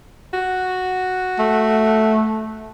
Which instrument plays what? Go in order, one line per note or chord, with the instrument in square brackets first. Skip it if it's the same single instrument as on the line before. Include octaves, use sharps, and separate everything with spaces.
[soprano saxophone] F#4
[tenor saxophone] A3